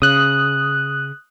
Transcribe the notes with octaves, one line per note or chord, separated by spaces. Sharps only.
C#3 D#6 F#6